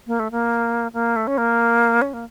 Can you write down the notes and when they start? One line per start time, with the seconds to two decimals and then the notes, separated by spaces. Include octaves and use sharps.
0.07 A#3
0.19 A3
0.31 A#3
0.94 A#3
1.16 A3
1.27 C#4
1.38 A#3
2.02 C#4
2.13 A#3